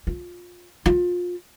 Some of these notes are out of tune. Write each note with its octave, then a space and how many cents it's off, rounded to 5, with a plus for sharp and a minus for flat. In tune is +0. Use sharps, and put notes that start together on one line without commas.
F4 +20
F4 +25